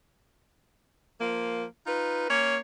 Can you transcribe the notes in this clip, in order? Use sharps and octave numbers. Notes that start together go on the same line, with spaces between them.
F3 A#3
D#4 F4 B4
A#3 C#4 C#5